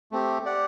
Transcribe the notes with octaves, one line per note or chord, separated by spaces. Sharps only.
A3 C4 G4
G4 D5 F#5